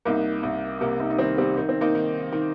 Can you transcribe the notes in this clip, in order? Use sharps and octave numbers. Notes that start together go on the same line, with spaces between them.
C2 A#3 D#4
C2
C3 A#3
A#3 D#4
D#4
D#3 G3 C4
G3 C4
D#3 D#4
C4
A#3 D#4
D#3
D#3